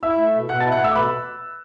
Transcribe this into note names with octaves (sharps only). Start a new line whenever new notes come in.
E4 E5 E6
A3
B2
B2 F#5 F#6
E4 A5 A6
F#5 F#6
A3 E5 E6
D6
B2 B4 B5